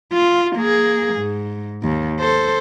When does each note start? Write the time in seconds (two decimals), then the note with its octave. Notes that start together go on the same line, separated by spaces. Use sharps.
0.13 F4
0.57 A#3 G#4
1.15 G#2
1.84 D#2
2.20 A4 C5